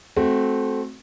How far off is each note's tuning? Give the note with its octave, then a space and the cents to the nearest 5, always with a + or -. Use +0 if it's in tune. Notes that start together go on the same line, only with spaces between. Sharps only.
A3 -20 C4 +0 F#4 +0